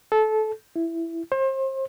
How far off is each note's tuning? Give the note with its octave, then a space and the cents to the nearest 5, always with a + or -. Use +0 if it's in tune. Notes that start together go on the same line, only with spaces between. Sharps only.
A4 -20
E4 +10
C5 +35